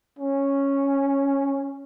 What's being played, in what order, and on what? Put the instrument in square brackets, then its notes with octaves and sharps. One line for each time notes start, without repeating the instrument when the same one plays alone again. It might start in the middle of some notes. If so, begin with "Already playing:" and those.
[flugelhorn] C#4